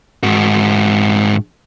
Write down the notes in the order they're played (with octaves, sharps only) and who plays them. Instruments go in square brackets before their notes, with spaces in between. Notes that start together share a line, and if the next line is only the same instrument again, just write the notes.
[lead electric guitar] G#2 F#4